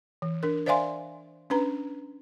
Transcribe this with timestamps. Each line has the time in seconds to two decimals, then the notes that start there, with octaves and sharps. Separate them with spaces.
0.22 E3
0.43 D4 A#4
0.66 C5 D5 E5 F5 G#5 C6
1.50 C#4 D4 B4 A#5